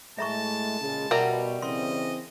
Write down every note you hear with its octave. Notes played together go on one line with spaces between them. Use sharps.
A2 G#3 A3 E5 A5 A#5 C#6
A#2 C#3 G#3
B2 G3 A#4 E5 F#5 A#5
C#3 E3 C4 D#5 C6